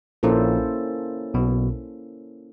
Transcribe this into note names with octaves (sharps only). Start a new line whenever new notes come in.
A#1 A#2 A#3 C#4 E4 A4 C5
B1 B2